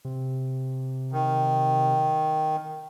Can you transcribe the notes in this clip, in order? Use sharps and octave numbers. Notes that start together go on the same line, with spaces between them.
C3
D#3